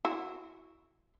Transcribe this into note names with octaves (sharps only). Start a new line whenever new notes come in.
E4 F#4